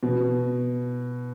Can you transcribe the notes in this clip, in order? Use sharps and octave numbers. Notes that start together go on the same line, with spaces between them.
B2